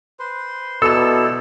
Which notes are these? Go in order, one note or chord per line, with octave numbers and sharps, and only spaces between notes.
B4 C5 C6
B2 D#4 E4 A4 D5 E6 E7